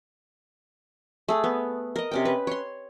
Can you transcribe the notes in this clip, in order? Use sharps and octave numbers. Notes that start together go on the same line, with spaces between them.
A3 G#4
B3
A#4 D#5
C3 C#4 G5
B4
C#5 C6